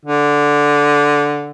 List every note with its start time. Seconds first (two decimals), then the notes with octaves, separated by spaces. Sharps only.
0.05 D3